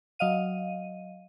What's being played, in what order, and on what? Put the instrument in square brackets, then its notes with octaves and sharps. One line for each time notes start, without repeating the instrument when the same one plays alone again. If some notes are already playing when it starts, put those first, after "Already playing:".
[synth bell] F#3 D#5 F5 D#7